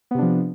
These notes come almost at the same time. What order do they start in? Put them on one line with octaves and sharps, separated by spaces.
B3 C3 D4 F3